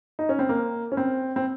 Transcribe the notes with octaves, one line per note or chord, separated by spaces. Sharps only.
D#4
C#4
C4
A#3
C#4
C4
C4